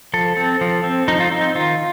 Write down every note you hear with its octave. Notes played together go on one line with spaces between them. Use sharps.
F3 A4
C4
F3
C4
F3 D#4
F4
C4 D#4
D#3 F4